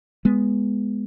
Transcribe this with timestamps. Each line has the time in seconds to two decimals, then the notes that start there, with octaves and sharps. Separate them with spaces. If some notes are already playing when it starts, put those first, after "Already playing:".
0.25 G#3 B3